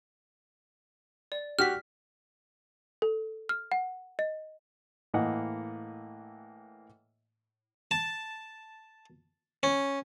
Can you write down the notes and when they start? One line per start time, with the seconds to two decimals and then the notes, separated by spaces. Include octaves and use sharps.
1.32 D5
1.59 F#4 G4 F6 B6
3.02 A4
3.49 F6
3.72 F#5
4.19 D#5
5.14 A2 E3 A#3 D#5 F#5
7.91 A5
9.63 C#4